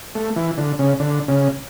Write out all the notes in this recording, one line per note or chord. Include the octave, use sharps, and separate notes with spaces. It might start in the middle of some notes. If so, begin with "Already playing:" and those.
A3
E3
D3
C#3
D3
C#3